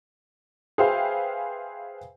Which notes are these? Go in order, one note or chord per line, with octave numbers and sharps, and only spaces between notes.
G#4 B4 C5 E5 F5 G5